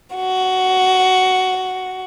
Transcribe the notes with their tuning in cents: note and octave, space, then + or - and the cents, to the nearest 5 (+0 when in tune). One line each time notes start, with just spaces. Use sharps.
F#4 +10